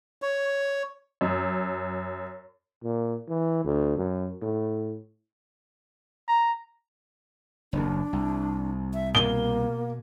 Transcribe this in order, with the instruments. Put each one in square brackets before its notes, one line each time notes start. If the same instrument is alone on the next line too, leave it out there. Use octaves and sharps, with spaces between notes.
[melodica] C#5
[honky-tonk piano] F#2
[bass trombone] A#2
E3
D2
F#2
A2
[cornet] A#5
[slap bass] F#1 D#2 [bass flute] D4
[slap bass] C2
[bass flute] E5
[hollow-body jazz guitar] B2 [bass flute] A#3 [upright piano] G7